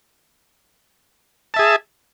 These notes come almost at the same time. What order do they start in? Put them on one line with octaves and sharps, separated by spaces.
A5 E5 G#4